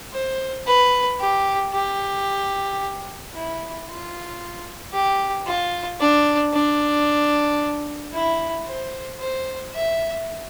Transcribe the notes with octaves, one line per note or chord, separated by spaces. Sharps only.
C5
B4
G4
G4
E4
F4
G4
F4
D4
D4
E4
C5
C5
E5